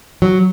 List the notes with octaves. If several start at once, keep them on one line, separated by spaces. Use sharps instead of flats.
F#3